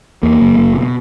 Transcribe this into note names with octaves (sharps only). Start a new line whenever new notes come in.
E2 A#3
F#1
F#1
B2